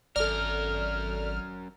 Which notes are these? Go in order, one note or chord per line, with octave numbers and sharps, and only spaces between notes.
G#1 F#2 A4 A#4 D5 F6